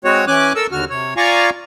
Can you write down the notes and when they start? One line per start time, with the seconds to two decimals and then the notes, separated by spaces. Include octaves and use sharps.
0.04 G#3 C4 F#4 C#5
0.27 E3 C#4 G#5 D6 F#6
0.55 A4 A#4 E6
0.72 D#2 D3 F#4 F6
0.90 C3 C#5
1.17 F4 D5 F5 G#5 A#5 C#6